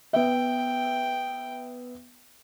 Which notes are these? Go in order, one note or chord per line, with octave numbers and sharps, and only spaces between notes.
B3 E5 G5